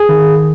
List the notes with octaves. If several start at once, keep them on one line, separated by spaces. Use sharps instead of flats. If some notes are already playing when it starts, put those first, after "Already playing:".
Already playing: G#4
D#3